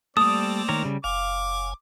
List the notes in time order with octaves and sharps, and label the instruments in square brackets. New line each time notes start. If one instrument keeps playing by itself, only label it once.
[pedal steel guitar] G3 A4 [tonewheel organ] A3 A#3 [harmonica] C4 D5 [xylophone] D#6
[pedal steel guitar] D#3 A#4 C#5
C#3 G3
[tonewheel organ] F#1 G#5 [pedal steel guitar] F5 [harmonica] D6